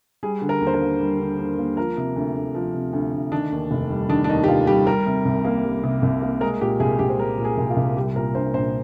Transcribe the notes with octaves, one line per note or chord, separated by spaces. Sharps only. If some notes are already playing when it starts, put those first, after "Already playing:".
G3 G#4
D3
A#4
D#2
C5
A#4
A#3
G3
D3
D#2
A#3
F3 A#4
C3
D2
D2
F3
C3
D2
D2
D#3 D4
D#2
F1
G3
D#3 D4
D4
D#2 D#4
G4
F1 F4
G3 G4
G3 A#4
C3
C2
A#3
G3
C3
C2
A#3
G#3 A#4
A#2 G4
C2 G#4
C2 G4
C5
G#3 A#4
A#2
G#4
C2
F4
C2
G3 G4
A#2 A#4
A#1 C5
A#1 C5